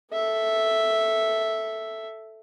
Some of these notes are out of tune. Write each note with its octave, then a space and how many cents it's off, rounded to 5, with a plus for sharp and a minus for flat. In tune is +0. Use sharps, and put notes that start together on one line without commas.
A4 +0 E5 +0